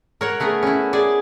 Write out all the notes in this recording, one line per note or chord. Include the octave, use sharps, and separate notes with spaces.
A#4 C#5 F#5
A3 B3 G#4 A#4
C#4 E4
G#4 D5